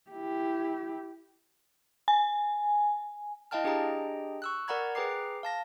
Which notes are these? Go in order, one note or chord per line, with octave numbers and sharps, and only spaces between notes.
E4 G4
G#5
E4 D#5 F5 G5 A5 F6
D4 G4 G#4 D#5 G5 A#5
C#6 E6 F#6
A#4 D5 F#5 A#5 B5 G#6
G#4 B4 G5 A#5 D6 C7
F5 A5 A#6